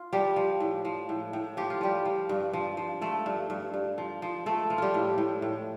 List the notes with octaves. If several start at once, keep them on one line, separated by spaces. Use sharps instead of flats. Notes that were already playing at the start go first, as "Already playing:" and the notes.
Already playing: F4
F3 G3 G4
F3
A2
F3
A2
A2
F3 G4
F4
F3 G3 G4
F3
G2
F3
F3
F3 A3 A4
G2
G2
G2
F3
F3
F3 A3 A4
F3
G3 F4 G4
A2
A2
A2